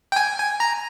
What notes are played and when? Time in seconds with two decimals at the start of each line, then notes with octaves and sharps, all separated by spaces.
0.12 G5
0.16 G#5
0.39 G#5
0.60 A#5